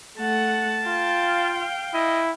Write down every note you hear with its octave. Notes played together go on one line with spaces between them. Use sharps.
A3 F#5 A5
F4 F5 G5
E4 D#5